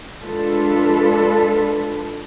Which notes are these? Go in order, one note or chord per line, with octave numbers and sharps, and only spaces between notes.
G#3 D4 F4 A4 B4